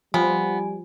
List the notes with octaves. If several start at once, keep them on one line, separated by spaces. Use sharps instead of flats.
F3 G3 B3 G#5